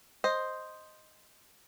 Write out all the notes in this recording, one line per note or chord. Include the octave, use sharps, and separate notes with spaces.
C5 D#5